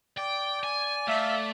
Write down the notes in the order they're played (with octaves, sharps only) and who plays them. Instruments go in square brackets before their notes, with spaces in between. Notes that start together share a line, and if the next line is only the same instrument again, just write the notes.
[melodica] D5 [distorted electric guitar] G5
[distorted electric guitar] G#5
[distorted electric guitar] A3 [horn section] E5 F5